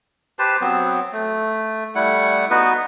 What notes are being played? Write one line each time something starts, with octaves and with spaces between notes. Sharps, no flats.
G4 B4 C5 A5
F#3 B3 C4
A3
G3 A3 E4 F#5
B3 D#4 F#4 B4